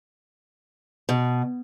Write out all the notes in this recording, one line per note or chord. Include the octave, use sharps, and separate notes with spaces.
B2